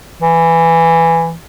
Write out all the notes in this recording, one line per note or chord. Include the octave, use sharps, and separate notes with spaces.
E3